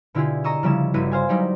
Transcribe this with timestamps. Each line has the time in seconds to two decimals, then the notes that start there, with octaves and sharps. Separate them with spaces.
0.15 B2 D3 E4 F4 G4 G#4
0.44 D#5 A#5 C#6 D#6 E6
0.63 C#3 F3 G3 C#4 E4 E7
0.94 G1 E4 F#4 G4 B4 D#7
1.11 C5 F5 G#5
1.29 F#3 G3 D#4 G4 D5